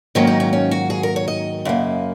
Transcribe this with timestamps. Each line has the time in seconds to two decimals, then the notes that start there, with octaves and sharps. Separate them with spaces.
0.15 G#2 D#3 F#3 A#3 C#4
0.27 D#4
0.40 C#4
0.53 C#4
0.71 F#4
0.90 G#4
1.03 A#4
1.16 C#5
1.28 D#5
1.65 F#2 C#3 A#3